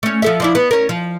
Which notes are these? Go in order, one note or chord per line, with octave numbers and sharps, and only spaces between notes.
A3 C#4
F3 A4 E5
F3 D4 E4
B3
C#4 A#4
F3